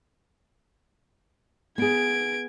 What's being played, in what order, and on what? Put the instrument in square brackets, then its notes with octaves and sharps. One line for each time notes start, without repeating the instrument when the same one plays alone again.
[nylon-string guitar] B3 G#4 [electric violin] G#6 D7